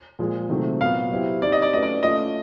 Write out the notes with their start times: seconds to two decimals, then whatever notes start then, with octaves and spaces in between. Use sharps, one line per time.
0.19 A#2 F3 G#3
0.50 C3 D#3 F#3 A3 C4
0.81 A#2 F#3 B3 F5
1.11 F#3 B3 E4 G4 C5
1.42 C4 D#4 G4 D5
1.52 D#5
1.62 D5
1.72 A3 C#4 F#4 B4 D#5
1.83 D5
2.02 A3 C#4 F4 D#5